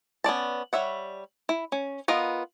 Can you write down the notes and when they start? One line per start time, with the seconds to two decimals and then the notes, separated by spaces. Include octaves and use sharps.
0.24 B3 C#4 D5 A5
0.73 G3 C#5 E5 F#5
1.49 E4
1.72 C#4
2.08 B3 F4 A#4 D#5